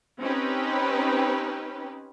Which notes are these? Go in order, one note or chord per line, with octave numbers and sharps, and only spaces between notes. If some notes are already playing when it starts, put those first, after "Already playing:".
C4 C#4 D#4 G4 B4